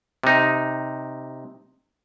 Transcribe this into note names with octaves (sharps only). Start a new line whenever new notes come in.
C3 D#4